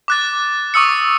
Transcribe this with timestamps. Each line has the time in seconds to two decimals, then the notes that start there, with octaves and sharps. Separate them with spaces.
0.08 D6 F#6 A6
0.74 C#6 D#6 E6 C#7